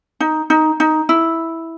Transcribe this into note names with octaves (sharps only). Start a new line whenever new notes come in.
D#4
D#4
D#4
E4